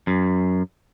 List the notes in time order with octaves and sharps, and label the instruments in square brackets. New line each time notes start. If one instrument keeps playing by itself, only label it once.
[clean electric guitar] F#2